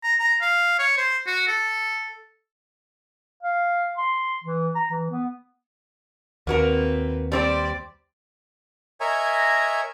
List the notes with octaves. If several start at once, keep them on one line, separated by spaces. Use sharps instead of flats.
A#5
A#5
F5
C#5
C5
F#4
A4
F5
C6
E3
A#5
E3
B3
D#2 A#3 C4 F#4 A#4 B4
G3 C4 C5 D5
A#4 C#5 D#5 E5 G#5 A#5